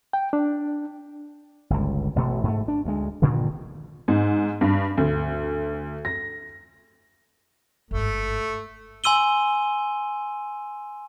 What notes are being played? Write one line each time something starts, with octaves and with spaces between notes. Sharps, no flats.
G5
D4
G1 C#2
A1 B2 A3
G#2 A3
D4
D2 G#3
G2 A#2 D3 D#3
G#2
G2
D2
A#6
G1 G#2 A3
G#5 C6 E6 D#7 G7